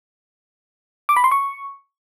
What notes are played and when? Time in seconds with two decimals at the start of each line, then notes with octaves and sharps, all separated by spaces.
1.09 D6
1.16 B5
1.24 C6
1.31 C#6